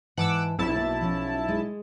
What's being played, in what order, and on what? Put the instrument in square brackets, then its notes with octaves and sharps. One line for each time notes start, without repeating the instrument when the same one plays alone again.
[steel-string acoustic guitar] G#2 E3 A5 [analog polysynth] F#5 D6 E6
[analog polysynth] B1 E4 A5 [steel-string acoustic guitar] C4
[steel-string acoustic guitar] A#3
F3 C#4
G#3